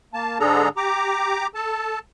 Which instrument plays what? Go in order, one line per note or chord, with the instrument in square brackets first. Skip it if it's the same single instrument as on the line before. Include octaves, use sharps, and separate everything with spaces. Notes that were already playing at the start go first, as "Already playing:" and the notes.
[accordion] A#3 A5
G#2 D3 D4 G#4 A4 A#5
G4 A#5 D6
A4 A5